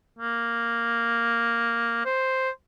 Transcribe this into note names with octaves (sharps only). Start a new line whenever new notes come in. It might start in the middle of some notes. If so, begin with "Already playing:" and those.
A#3
C5